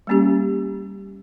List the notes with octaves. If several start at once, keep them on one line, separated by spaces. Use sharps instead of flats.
G3 A#3 C#4 G4